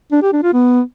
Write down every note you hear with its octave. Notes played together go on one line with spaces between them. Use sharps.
D4
G4
D4
F4
B3